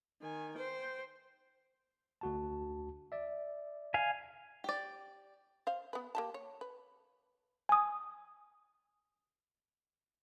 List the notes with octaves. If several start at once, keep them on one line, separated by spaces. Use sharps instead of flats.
D#3 G#5
C5 G5
D2 F#4 A5
D5 E5
F5 G#5
G4 D5
C5 F5
B3 B4
A#3 G4 A5
C#5
B4
G#5 D#6